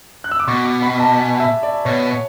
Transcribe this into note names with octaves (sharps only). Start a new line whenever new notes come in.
F#6
E6
D6
B2 C#6
D6
B5
A5
G#5
E5
D5
B2 C#5
C#5